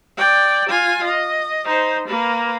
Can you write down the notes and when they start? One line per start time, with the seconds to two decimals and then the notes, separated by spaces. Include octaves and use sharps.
0.17 D5 G5
0.70 F4 G#5
1.04 D#5
1.65 D#4 C5
2.08 A#3 B4